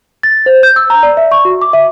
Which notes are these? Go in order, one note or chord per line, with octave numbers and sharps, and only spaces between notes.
A6
C5
G6
E6
A#5
D5
E5
C#6
F#4
D6
E5